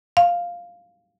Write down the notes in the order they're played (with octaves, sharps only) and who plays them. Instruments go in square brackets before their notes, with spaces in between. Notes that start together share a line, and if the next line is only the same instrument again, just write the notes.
[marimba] F5